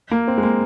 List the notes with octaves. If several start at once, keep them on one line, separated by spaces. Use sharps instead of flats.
A#3
C4
G#3
A#3